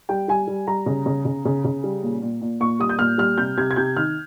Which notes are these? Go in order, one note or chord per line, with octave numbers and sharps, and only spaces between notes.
G3 G5
G3 G#5
G3
G3 A#5
C#3
C#3
C#3
C#3
C#3
G3
A#2
A#2
A#2
A#2 C#6
G3 D#6
G6
A#2 F6
G3 F6
C3 G6
C3 G#6
G#6
C3 G6
D#3 F6